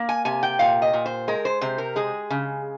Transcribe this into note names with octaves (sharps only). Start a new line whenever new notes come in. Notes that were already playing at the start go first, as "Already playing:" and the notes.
Already playing: A#3
G#5
C3 G#5
G5
A#2 F5
D#5
A#2
C5
G#3 A#4
C5
C3 C5
A#4
G#3 G#4
C#3